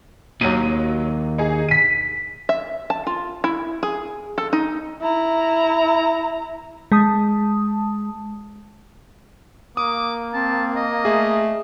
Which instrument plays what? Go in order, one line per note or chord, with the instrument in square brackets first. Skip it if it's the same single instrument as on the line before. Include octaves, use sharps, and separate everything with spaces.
[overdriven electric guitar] D#2 [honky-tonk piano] F#3 D#7
[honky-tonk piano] D#4 G#4
B6 D#7
[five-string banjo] E5
A5
F4
E4
G#4
A4
D#4
[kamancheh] E4 A#5
[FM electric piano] G#3 A5 D#6
[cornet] A#3 [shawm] D6 [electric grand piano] D#6
[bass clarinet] C4 [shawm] A5
[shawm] D#5
[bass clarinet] A3 [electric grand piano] G#4